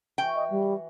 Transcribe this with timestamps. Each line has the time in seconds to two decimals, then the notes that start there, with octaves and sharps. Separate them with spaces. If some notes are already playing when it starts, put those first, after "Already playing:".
0.18 E3 F#4 G5 C#6
0.35 D#5
0.50 G3